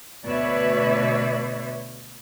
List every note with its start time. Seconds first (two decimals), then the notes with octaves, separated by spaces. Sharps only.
0.25 D2 B2 B4 C#5 D5 E5